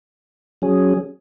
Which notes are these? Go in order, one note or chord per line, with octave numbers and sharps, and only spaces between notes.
F#3 C#4 G#4